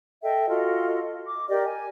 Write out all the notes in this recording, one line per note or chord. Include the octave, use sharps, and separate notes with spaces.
A4 D#5 E5 G5
F4 F#4 A4 D#5
D6
G4 A#4 D5 D#5
G#5